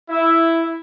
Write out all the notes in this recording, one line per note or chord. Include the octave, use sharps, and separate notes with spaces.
E4